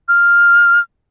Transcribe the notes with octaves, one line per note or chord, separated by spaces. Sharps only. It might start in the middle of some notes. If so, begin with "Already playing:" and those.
F6